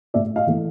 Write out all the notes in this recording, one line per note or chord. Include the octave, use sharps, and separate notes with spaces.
A2 D5 E5
D#5 F5
E3 A3